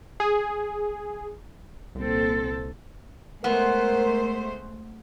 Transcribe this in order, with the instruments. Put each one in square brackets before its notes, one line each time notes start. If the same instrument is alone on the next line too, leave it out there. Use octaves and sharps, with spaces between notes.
[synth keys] G#4
[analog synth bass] C2 [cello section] A#2 C4 A4
[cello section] G#3 A3 C5 [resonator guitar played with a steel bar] B3 [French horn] A#4